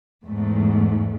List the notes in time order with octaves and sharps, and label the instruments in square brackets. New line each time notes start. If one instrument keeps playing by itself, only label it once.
[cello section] E2 G#2 A3